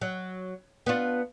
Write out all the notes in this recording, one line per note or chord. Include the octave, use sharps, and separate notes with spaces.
F#3
B3 D4 F4